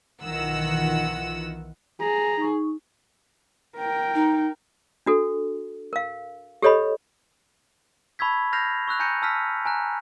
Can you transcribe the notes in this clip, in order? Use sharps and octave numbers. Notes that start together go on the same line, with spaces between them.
B1 D#3 E3 F4 F#5 E6
G#4 A#5
D#4 C#6
A#4 G5
D#4
D4 F#4 A4
A#4 F5
G4 A4 C#5 D#5 B5
A5 B5 C#6 E6 G#6 B6
F6 G6 A#6 C7 F7
C#6 E6 F#6 F7
G#5 A#5 G6 A#6 C#7 D#7
A5 E6 F6 B6
G#5 A#5 F#6